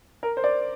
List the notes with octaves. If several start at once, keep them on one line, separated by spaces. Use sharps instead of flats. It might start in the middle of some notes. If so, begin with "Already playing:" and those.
A#4
C5
D5